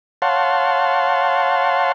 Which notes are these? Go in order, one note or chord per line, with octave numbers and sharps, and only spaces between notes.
C#5 F5 F#5 A5 C6